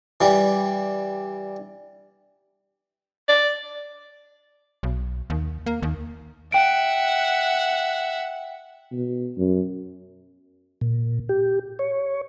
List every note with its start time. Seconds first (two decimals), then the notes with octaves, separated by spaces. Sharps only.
0.21 E3 G3
3.29 D5
4.83 B1
5.30 D#2
5.66 A#3
5.82 D#2
6.52 E5 F#5 G5 D7
8.92 B2
9.38 F#2
10.81 A#2
11.29 G4
11.79 C#5